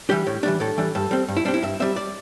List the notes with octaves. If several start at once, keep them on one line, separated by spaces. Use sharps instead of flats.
E3 G3 D4 G4
A2
E3 G3 D4
A2 A4
E3 G3 D4
G2 A4
G3 C4
G2
E4
G3 C4 D4
E4
G2 E5
G3 C4 E5
D5